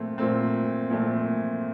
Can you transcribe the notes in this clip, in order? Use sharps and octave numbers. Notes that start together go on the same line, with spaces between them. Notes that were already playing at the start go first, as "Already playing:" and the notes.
Already playing: A#2 A3 C4
A#2 A3 C4
A#2 A3 C4